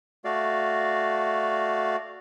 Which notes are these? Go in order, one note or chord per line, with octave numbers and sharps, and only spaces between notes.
A3 F#4 D5 F5